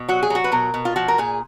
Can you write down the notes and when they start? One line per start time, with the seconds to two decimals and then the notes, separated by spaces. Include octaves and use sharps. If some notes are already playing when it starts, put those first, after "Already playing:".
Already playing: B2
0.08 F#3 F#4
0.23 G#4
0.30 F#3 F#4
0.44 B4
0.52 B2 A#4
0.74 B2
0.85 F4
0.96 F3 F#4
1.08 A#4
1.18 A#2 G#4